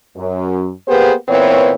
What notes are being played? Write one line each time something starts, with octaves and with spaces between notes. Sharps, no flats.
F#2
A#3 B3 G4 G#4 B4 C5
A#2 E3 B3 C4 C#5